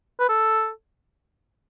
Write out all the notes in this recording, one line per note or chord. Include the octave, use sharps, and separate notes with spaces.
B4
A4